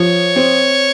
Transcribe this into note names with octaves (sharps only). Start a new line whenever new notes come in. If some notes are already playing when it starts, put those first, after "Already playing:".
Already playing: F3 C#5
C4